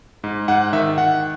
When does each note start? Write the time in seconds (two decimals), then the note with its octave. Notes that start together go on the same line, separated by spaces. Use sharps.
0.24 G#2
0.48 G#2 F#5
0.73 D#3 E5
0.98 D#3 F#5